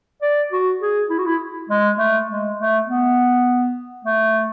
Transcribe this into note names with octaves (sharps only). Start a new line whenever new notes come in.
D5
F#4
G#4
E4
F#4
E4
G#3
A3
G#3
A3
B3
A3